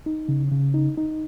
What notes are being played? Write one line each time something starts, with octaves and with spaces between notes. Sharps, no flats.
D#4
C#3
C#3
D#4
D#4